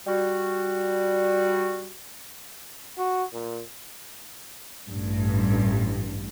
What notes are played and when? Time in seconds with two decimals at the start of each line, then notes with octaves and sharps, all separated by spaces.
0.07 G3 F#4
2.98 F#4
3.33 A#2
4.89 A1 G2